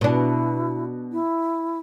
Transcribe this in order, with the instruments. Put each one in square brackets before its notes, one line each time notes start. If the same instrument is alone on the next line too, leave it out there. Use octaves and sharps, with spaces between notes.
[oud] B2 D4 [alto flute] E4
[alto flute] E4